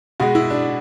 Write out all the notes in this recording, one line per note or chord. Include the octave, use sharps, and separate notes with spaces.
B2 G#3 F#4
E4
D4